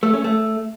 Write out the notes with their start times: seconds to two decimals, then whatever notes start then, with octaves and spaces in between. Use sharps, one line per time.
0.03 A3
0.14 C#4
0.24 A3